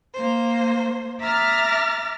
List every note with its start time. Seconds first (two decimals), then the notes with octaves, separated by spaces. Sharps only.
0.13 A#3 C5
1.20 E5 A#5 D6 F6 A6 A#6